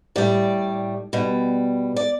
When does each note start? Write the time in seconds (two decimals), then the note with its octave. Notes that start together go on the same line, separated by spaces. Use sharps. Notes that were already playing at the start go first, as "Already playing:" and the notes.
0.16 A2 G3 D5
1.13 B2 G3
1.96 D5